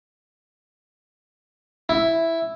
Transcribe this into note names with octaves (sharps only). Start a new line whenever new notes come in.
E4